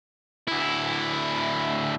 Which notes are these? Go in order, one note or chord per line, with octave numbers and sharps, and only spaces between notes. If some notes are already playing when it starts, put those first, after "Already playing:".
D2 E4